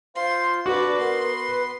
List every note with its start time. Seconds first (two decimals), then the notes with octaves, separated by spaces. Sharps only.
0.16 F4 C5 C6
0.66 D3 F#4 B4 D5 D6
0.99 B3 A#4 C6
1.33 B4